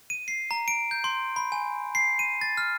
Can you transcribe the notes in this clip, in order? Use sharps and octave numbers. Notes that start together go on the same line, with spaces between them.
D#7
C7
A#5
D7
G6
C6
B5
G#5
C7
D#7
A6
F6